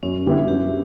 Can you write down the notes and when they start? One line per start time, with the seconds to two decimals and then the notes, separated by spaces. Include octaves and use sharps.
0.03 F#2 C#4
0.26 D3 G3 B3 D4 E4
0.48 F#2 G4